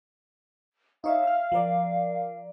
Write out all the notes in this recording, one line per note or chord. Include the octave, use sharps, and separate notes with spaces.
D#4 C#5 E5 F5
E5 F6
F3 A#4 D5